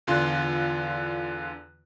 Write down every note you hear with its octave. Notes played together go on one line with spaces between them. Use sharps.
E2 D3 F4 C6 F#6